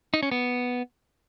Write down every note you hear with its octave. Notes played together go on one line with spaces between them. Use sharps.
D#4
C#4
B3